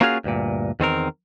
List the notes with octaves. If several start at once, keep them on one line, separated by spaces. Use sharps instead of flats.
A#3 C#4 F4 F#4 G#4 F5
D2 G2 A#2
E2 D#3 C4 A#4